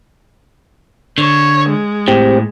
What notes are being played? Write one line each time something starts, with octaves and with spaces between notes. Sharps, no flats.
D3 C#5
G#3
A2 C4 G4